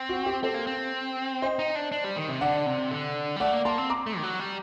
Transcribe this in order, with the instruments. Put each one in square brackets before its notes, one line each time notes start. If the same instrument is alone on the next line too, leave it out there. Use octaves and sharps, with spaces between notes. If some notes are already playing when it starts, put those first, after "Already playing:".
Already playing: [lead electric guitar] C4
[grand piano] F#4
G4
[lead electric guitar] C4 [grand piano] A4 C5
[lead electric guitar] A#3
C4
[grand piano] C5 D#5
[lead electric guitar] D#4
D4
D4
G3
D#3
C3
[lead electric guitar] D3 [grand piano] D5 F#5
[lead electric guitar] C3
D3
G3
[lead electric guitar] A3 [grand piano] D5 F#5
[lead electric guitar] A#3
[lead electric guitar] A#3 [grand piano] A5 C6
[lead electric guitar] C4
[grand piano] A#5 D6
[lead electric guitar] A3
D#3
F#3
G3